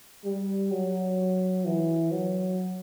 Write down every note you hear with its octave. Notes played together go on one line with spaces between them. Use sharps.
G3
F#3
E3
F#3